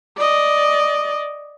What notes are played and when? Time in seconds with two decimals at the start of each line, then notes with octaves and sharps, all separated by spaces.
0.18 D5 D#5